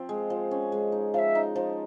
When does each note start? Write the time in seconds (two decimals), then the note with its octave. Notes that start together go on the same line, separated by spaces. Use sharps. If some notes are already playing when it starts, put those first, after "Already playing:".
Already playing: F3 C4
0.09 G#3
0.30 F3
0.51 C#4
0.72 G#3
0.92 D#4
1.13 F3 E5 F5
1.35 D#4
1.56 F3